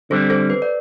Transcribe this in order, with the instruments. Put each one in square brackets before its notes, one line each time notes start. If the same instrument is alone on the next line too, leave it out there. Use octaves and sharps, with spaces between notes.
[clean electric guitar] D3 G3 C4 [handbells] A4 C5
[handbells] A4 C5
B4
D5